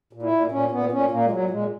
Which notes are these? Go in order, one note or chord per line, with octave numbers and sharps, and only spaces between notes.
A#2
E4
A#2
A#2 C#4
A#2 B3
A#2 C#4
A#2 A#3
G#3
A#2 F#3
A#2 G#3